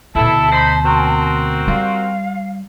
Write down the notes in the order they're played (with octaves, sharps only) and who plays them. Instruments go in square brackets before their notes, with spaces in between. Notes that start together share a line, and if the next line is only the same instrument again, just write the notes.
[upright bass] D2 B2 [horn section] E4 A4 [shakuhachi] A5
[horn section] D#4 C5 B5
C4 F#4 A#4
[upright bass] G3 [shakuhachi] F5